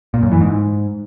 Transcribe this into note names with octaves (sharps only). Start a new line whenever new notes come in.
A#2
F#2
E3
G#2